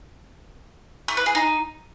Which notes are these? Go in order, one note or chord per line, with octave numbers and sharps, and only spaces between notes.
A3
B4
G#4
D#4